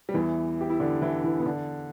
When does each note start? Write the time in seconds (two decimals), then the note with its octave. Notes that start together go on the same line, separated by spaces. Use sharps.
0.09 G3
0.14 E2 E3
0.61 G4
0.70 E4
0.80 D3 D4
1.02 E3 E4
1.24 E3 E4
1.39 B3
1.46 D3 D4